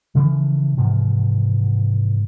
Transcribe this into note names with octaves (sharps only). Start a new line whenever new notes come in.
C#3 E3 F3
G#2 C3 E3 F3